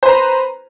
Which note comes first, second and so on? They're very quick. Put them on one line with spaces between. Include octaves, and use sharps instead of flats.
C5 B4 A#5